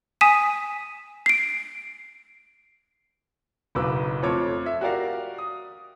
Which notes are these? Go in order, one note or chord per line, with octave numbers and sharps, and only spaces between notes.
G#5 D#6 B6 D#7 E7
C7 D7
F#1 B1 B2 B4 D6 E6
F2 A3 A4 C#5 D6
E5
F#4 G4 A#4 D5 F5
D#6